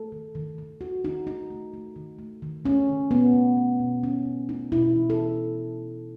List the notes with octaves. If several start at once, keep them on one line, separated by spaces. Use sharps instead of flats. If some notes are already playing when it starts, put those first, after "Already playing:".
Already playing: A3 A4
D#3
D#3
D#3
D#3 F#4
D#3 D#4
A3 D#4
A3
A3
D#3
A3
D#3
A3 C#4
D#3
B2 B3
A3
A3
B2
B2 C#4
B2
A3 D#4
B2 E4
E3
A4